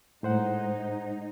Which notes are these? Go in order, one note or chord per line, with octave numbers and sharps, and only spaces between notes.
A2 G#3 D#4 C5 F#5